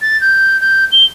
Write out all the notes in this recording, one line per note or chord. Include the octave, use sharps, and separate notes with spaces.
A6
G6
G6
G7